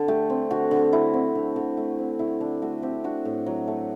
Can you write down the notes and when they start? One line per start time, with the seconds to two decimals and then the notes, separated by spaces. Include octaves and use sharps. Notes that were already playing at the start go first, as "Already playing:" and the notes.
Already playing: D3 A4
0.08 A3 G4
0.30 C4
0.51 D3 F#4
0.71 D3
0.93 A3 E4
1.14 C4
1.35 D3
1.56 D3
1.77 A3
1.99 C4
2.19 D3 E4
2.41 D3 D4
2.62 A3 F#4
2.82 C4 G4
3.04 D4 F#4
3.25 A2
3.46 F#3
3.68 A3